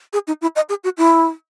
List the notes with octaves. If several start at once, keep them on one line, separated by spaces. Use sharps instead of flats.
G#4
D#4
E4
D#5
G#4
F#4
E4